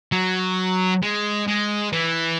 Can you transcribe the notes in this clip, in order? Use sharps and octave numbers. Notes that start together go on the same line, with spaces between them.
F#3
G#3
G#3
E3